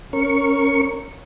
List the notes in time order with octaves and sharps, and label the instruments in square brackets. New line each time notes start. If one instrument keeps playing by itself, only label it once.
[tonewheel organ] C#4 A#4 C#6